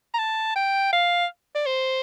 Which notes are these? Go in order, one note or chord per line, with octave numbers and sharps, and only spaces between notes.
A#5
A5
G5
F5
D5
C5